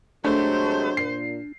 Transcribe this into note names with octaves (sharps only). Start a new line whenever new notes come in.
C3 F#3 G#3 A3 D4 C5
A#2 C7